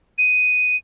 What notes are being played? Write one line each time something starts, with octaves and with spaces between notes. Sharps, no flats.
D#7